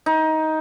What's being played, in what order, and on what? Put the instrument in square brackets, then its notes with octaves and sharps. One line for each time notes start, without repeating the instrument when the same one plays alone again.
[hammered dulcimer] D#4